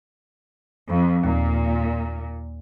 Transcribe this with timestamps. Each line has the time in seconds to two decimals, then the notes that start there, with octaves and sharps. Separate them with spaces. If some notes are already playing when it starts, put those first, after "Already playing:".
0.89 F2
1.24 D#2 A#2